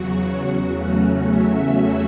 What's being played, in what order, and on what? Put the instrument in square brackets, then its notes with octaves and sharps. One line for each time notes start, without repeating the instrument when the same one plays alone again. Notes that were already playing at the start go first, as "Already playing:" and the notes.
Already playing: [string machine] E2 C#3 F#3 F#4
E2 C#3 F#3 A3 C#4
E5